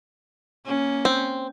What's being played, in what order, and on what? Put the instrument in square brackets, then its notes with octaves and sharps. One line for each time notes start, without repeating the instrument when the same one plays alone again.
[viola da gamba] A#3 C#4
[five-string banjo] C4